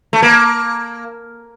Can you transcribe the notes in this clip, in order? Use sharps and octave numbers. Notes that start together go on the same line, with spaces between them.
A3
A#3